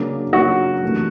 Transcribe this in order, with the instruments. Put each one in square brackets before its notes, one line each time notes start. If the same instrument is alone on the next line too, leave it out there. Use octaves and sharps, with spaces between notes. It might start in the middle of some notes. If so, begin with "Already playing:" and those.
Already playing: [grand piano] C#3 F#3 A#3 D4
[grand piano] C#3 F#3 A#3 D4 [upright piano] F#4
[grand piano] C3 E3 A3